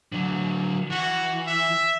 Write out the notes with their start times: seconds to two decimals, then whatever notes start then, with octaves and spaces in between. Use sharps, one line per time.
0.12 D3 F#3
0.91 E3 F#4
1.47 E5